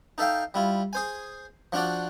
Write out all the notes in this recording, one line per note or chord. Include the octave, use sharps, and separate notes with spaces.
D#4 A4 E5 F5 G5
G3 E4 F4
G#4 C5 G#5
F3 D4 F4 F#4 D5